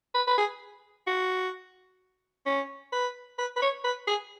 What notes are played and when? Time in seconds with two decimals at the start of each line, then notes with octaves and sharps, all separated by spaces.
0.15 B4
0.27 B4
0.38 G#4
1.07 F#4
2.46 C#4
2.92 B4
3.38 B4
3.57 B4
3.62 C#5
3.84 B4
4.07 G#4